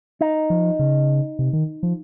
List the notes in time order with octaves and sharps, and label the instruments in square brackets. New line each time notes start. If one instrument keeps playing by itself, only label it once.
[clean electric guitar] D#4
[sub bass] F3
C#3
C3
D#3
F3